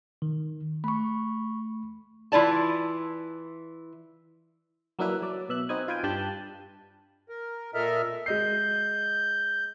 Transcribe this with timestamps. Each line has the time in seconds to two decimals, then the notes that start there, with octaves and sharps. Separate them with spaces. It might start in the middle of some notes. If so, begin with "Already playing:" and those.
0.22 D#3
0.84 A3 B5 C#6
2.32 E3 E4 F4 D5 A5
4.99 F#3 A#3 D4 E4 B4
5.22 F#3 D5
5.49 B2 E5 F#6
5.69 C4 D#4 F#4 B4 G#5
5.88 F4 B4 G5 G#5
6.03 G2 D4 G4 A5 F#6 G6
7.29 A#4
7.74 A#2 A4 A#4 D#5 E5 F6
8.26 G#3 D#5 G6 C7